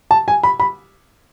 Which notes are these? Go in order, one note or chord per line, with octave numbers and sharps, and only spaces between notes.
A5
G#5
B5
B5